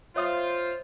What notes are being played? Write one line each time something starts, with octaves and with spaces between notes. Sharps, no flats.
F4 C5 C#5 E5 D#6